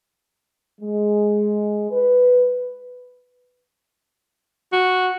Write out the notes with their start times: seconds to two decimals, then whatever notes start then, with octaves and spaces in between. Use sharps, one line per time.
0.81 G#3
1.91 B4
4.73 F#4